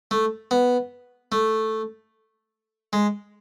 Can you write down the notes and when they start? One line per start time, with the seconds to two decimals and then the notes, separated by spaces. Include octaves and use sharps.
0.11 A3
0.51 B3
1.32 A3
2.93 G#3